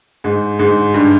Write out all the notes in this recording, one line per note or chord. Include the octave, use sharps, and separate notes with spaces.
G#2
G#2
G2